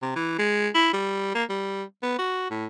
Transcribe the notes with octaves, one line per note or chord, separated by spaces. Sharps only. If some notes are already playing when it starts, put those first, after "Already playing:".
C3
E3
G#3
E4
G3
A#3
G3
B3
F#4
A2